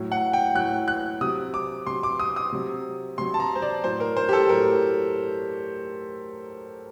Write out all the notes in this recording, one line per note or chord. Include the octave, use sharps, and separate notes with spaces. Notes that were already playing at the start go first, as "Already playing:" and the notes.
Already playing: A2 F#3
F#5
G5
A2 F#3 F#6
F#6
C3 F#3 D#6
D6
C3 F#3 C6
D6
D#6
D#6
C3 F#3
C3 F#3 C6
A5
A#5
C5
D5
A2 F#3 C5
A#4
C5
G4
A4
A2 F#3 A#4